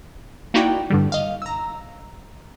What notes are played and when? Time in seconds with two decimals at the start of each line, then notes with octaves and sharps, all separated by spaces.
0.54 A#3 D#4 E4 F#4 D5 G5
0.90 G2 D3 G3
1.12 D#5 F5
1.42 A#5 E6